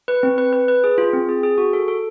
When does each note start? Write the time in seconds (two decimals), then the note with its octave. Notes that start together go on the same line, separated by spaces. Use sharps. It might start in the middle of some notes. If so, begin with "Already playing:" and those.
0.08 B4
0.23 C4
0.38 B4
0.53 B4
0.68 B4
0.84 G#4
0.98 F4
1.13 C4
1.29 G#4
1.43 G#4
1.58 F#4
1.73 A4
1.88 A4